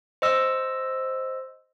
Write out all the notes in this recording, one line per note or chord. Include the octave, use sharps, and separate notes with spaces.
C5 D#5 E6